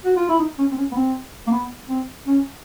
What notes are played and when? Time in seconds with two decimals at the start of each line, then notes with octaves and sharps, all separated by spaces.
0.05 F#4
0.16 F4
0.29 E4
0.39 D#4
0.59 C#4
0.71 C4
0.77 C#4
0.92 B3
0.96 C4
1.47 A#3
1.51 B3
1.89 C4
2.27 C#4